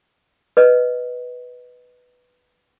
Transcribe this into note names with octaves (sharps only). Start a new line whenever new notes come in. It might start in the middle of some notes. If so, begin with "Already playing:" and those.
B4 D#5